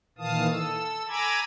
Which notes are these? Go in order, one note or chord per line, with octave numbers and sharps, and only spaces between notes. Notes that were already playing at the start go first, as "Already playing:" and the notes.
A#2 D#3 E3 F5 A5 D#6
A4 E6
G#5 A#5 B5 D6 E6 G#6